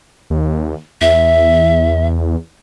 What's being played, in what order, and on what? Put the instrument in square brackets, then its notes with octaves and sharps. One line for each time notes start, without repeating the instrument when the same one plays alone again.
[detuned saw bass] D#2
[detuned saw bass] E2 [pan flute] E5